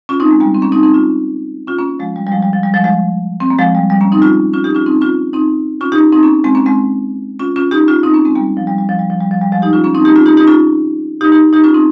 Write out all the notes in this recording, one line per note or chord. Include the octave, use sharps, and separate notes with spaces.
C#4 F4
C4 D#4
G#3
G3 A#3
C4
A#3 C#4
C4 D#4
C4 D#4
C#4 F4
C#4 F4
A#3 C#4
F3 G#3
G3
G3
F3 G#3
G3
F3
G3
F3 G#3
F3 G#3
C4
A#3
F3 G#3
G3
G3
A#3 C#4
C4 D#4
C#4 F4
C#4 F4
D#4 G4
C#4 F4
C4 D#4
C#4 F4
C4 D#4
C#4 F4
D#4 G4
C4 D#4
A#3 C#4
G#3 C4
A#3 C#4
G#3 C4
C#4 F4
C#4 F4
D#4 G4
C#4 F4
C4 D#4
A#3 C#4
G#3 C4
G3 A#3
F3
G3
G3
F3
G3
F3
G3
F3
G3
F3 G#3
D#4 G4
C#4 F4
A#3 C#4
C4 D#4
D#4 G4
C#4 F4
D#4 G4
D#4 G4
C#4 F4
D#4 G4
D#4 G4
D#4 G4
C#4 F4
C4 D#4